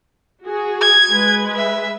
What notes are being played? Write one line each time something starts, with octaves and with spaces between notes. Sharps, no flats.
F#4 G#4
G#6
G#3 B4
E5